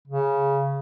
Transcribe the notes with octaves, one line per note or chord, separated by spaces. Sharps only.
C#3